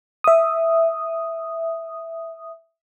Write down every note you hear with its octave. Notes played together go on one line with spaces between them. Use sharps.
E5 D#6